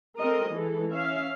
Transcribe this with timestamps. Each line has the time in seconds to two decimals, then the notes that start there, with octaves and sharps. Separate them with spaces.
0.19 C4 A4 A#4 D#5
0.53 E3 G#3 A4
0.90 C#4 E5 F5